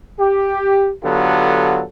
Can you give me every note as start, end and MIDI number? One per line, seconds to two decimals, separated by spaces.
0.19 0.92 67
1.04 1.83 50
1.04 1.83 54
1.04 1.83 59
1.04 1.83 65
1.04 1.83 67
1.04 1.83 69